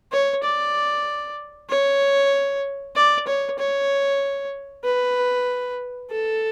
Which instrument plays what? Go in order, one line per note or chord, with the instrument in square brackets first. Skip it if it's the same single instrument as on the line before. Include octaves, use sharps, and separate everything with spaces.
[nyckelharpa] C#5
D5
C#5
D5
C#5
C#5
B4
A4